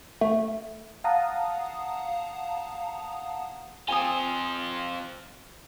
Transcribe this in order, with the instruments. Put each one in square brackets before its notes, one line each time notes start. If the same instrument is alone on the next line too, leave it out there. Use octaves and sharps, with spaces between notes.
[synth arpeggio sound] A3
[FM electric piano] F5 F#5 A5 A#5 D#6
[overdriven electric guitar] C4 F4 [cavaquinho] G#5 D#6